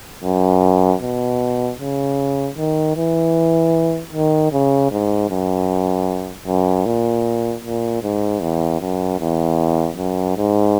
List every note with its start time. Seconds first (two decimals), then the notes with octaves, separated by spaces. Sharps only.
0.24 F#2
1.01 B2
1.79 C#3
2.58 D#3
2.97 E3
4.13 D#3
4.52 C#3
4.91 G#2
5.30 F#2
6.47 F#2
6.86 A#2
7.63 A#2
8.03 G#2
8.42 E2
8.80 F#2
9.20 E2
9.97 F#2
10.37 G#2